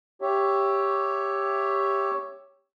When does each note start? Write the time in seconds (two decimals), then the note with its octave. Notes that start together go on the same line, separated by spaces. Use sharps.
0.21 G4 C#5 E5